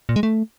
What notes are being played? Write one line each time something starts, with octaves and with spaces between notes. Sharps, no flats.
A#2
G#3
A3